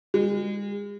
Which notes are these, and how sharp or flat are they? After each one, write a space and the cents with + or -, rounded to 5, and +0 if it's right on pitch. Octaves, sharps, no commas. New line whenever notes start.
G#3 -40